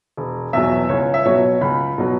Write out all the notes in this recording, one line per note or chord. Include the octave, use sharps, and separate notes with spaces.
E1
E2 B2 F#3 E5
C#2 C#5
E5
B2 F#3 C#5
C#2 B5
B2 F#3